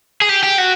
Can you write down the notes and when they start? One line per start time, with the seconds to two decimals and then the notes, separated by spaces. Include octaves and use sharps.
0.21 G#4
0.29 G4
0.43 G4
0.58 F#4